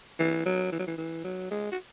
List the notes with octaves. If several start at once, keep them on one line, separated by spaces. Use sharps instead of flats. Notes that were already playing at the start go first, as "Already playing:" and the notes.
E3
F#3
E3
F#3
E3
E3
F#3
G#3
F#4